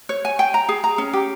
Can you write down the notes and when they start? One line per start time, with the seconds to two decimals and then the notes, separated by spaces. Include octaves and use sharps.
0.09 C#5
0.25 G#5
0.39 G5
0.54 A#5
0.69 G#4
0.84 A#5
0.98 C#4
1.13 G4